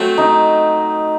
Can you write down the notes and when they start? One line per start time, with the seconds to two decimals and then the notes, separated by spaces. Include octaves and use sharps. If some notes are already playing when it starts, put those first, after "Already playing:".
Already playing: F#3 A3 C4
0.18 D#4